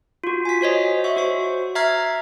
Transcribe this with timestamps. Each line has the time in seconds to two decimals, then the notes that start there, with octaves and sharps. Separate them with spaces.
0.24 F4 F#4
0.45 G#5 B6
0.61 F#4 C5 C#5 D#5
1.04 E5 C#6
1.17 F#4 C5 C#6
1.75 E5 A#5 F6 G#6 C7